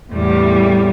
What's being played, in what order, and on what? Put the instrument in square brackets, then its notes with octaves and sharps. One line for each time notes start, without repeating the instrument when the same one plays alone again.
[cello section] E2 A2 G3